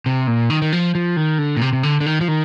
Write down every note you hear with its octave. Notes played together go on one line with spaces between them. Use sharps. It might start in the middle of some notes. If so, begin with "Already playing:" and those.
C3
A#2
D#3
D#3
F3
F3
D#3
D3
A#2
C3
C3
D3
D3
D#3
F3
D#3